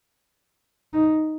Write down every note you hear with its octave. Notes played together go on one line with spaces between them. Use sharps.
D#4